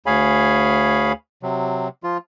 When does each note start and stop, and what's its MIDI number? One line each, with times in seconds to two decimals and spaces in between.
0.06 1.12 38
0.06 1.12 68
0.06 1.12 73
0.06 1.12 77
0.06 1.12 80
0.06 1.12 83
1.43 1.88 48
1.43 1.88 54
2.04 2.17 53
2.04 2.17 65